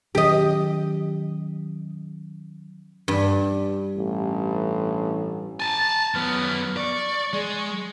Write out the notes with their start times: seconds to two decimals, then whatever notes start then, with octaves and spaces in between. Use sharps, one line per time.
0.15 D#3 F#3 C#4 G4 D#5
3.08 G2
3.96 A1
5.60 G#5 A5 A6
6.14 F#2 B3 F6
6.77 D5 C#6
7.33 G#3